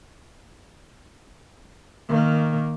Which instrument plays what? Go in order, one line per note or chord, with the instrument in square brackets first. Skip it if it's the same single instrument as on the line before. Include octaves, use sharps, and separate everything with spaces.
[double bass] D#3 A#3